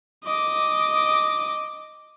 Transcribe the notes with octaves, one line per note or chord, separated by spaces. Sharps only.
D#5 D6